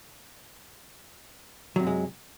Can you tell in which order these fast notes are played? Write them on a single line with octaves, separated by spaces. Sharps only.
F#3 C3 F#2 G#3